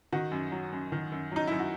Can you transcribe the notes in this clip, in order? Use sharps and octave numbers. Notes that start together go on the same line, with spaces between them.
D#3 F#4
F#2
F#3
F#2
D#3
F#2
F#3 D#4
F#2 E4
F#4